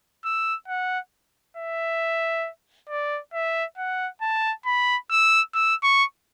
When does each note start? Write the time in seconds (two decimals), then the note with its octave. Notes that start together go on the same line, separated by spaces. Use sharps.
0.25 E6
0.68 F#5
1.57 E5
2.89 D5
3.34 E5
3.78 F#5
4.22 A5
4.66 B5
5.10 E6
5.55 E6
5.83 C#6